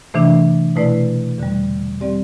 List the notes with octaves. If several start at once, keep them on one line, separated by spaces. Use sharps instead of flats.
C3 E3 A3 D4
B2 A3 E4 B4 D5
E2 D3 G3
G3 C4 G4 D5